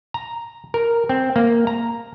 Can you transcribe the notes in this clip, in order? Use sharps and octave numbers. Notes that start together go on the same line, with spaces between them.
A#5
A#4
C4
A#3
A#5